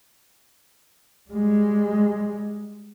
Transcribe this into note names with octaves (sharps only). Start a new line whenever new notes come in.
G3 G#3